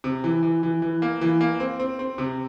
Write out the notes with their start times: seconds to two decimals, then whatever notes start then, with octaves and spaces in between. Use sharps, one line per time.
0.04 C3
0.24 E3
0.43 E3
0.63 E3
0.82 E3
1.02 A#3
1.21 E3
1.41 A#3
1.60 C4
1.79 C4
1.99 C4
2.18 C3